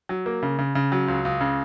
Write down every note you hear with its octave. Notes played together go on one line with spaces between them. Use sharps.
F#3
A#3
C#3
C#3
C#3
F#3
C#2
C#2
C#3